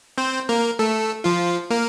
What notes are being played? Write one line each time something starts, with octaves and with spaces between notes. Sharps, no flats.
C4 C5
A#3 A#4
A3 A4
F3 F4
A#3 A#4